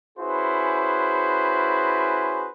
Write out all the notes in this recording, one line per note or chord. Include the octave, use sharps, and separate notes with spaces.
C#4 E4 F#4 G#4 B4 C5